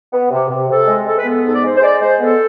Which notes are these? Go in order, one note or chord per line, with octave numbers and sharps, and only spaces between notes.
B3
C3
C3
C3 A4
G#3
G#3 A4
B4
B3 A4
G#2 A4
D5
G#3 C5
C5
G#3 D5
G#3 C5
B3 A4